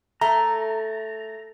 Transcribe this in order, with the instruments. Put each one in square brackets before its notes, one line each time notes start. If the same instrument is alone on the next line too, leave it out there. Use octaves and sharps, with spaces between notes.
[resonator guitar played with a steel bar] A3 [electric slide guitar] A#5